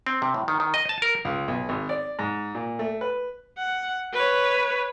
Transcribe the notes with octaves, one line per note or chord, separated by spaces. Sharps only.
C4
C3
A2
D#3
D#3
D#5
A5
A#4
C#2
B1
G#1
D5
G#2
A#2
A3
B4
F#5
B4 C#5